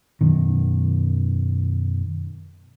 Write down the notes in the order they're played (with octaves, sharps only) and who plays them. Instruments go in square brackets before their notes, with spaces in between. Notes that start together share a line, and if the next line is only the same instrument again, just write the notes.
[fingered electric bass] F#2 B2 D#3